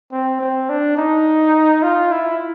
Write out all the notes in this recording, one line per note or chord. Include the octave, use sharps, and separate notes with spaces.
C4
C4
D4
D#4
F4
E4